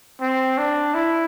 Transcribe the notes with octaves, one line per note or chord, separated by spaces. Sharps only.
C4
D4
E4